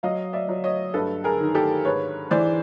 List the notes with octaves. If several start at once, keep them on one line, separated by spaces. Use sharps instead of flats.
F#3 D#5 F5
D5 E5
F#3
C#5 D#5
G2 A4 B4
G#4 A#4
D#3
G4 A4
G#2 B4 C#5
E3 C5 D5